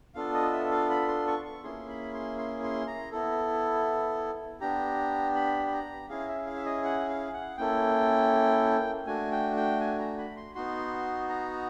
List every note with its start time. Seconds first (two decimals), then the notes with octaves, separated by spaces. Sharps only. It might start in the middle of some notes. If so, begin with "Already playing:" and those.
0.15 B3 D4 F4 A4 F5
0.34 D#5
0.52 E5
0.71 F5
0.90 B5
1.08 C6
1.27 C#6
1.45 C#6
1.63 A#3 C#4 E4 G#4 C6
1.89 B5
2.14 C6
2.39 C6
2.63 C6
2.87 A#5
3.12 B3 E4 A4
4.61 B3 D4 G4 A#5
5.35 B5
5.67 B5
5.73 A#5
6.09 C#4 E4 G#4 F5
6.29 E5
6.46 F5
6.56 E5
6.65 D#5
6.84 F#5
7.09 F5
7.34 F#5
7.58 A#3 C#4 E4 A4 G5
9.06 A3 D4 F#4 G#5
9.31 G5
9.57 G5
9.81 G#5
9.99 A#5
10.18 B5
10.37 C6
10.55 B3 D#4 F#4 C6
11.29 A#5